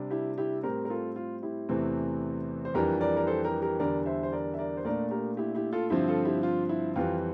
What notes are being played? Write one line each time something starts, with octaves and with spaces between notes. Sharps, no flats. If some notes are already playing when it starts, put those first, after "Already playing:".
Already playing: C3 G3 D4
E4 G4
E4 G4
A2 G3 C4 G4 A#4
A#4
F4 A4
F4
E4 G4
E2 C3 E3 A3 C4
C5
F2 E3 G3 D4 G4 A#4
A#4 D5
A#4
A4 C5
G4 A#4
G4 A#4
E2 D3 G3 A#4 D5
C5 E5
C5
A#4 D5
E5
A#4 D5
C5
A#2 A3 D4 A#4 D5
G4 A#4
E4 G4
E4 G4
F4 A4
G2 D3 F3 C4 E4 G4
F4 A4
E4 G4
F4
E4
F2 E3 G3 C4 F4